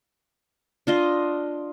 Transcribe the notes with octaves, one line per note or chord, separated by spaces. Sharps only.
D4 F4 D#5